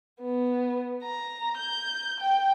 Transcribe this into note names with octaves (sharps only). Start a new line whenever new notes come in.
B3
A#5
G6
G5